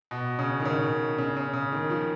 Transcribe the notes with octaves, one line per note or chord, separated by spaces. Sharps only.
B2
C#3
D#3
C#3
C#3
C#3
C#3
D#3
F3